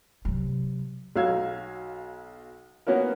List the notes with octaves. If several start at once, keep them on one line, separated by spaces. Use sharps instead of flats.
C3 F#3
B1 F#3 F5 E6 G#6
A#3 B3 C#4 F#4 A#4